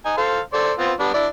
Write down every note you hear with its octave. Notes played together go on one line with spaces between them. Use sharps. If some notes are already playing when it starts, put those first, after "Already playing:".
D#4 G#5
A4 C5 F5
A4 C5 D5
B3 C4 F4
G3 B3 D4
D4 E4 D5